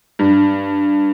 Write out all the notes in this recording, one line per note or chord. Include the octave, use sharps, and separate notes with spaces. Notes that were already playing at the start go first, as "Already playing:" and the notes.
G2